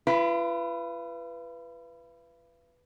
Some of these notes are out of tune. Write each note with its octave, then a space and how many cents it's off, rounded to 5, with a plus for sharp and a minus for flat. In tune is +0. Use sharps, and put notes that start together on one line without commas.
F4 -45 B4 +0